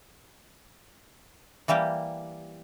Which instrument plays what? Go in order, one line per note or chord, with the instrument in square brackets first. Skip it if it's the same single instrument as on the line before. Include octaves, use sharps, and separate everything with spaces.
[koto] E3 G3 A#3 G4